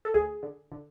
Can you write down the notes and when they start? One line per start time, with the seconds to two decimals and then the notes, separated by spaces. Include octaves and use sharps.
0.05 A4
0.14 D2 G#4
0.43 D3
0.72 D3